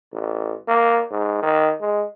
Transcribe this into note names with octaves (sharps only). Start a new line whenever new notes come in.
A1
A#3
G#2
D#3
G#3